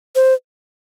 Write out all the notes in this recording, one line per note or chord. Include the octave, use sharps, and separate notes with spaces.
C5